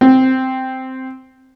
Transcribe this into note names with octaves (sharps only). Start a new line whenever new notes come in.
C4